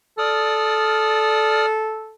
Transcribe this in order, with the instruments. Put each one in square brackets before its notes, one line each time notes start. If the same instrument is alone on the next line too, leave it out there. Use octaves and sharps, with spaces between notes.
[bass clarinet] A4 [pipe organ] D5 D#6 F6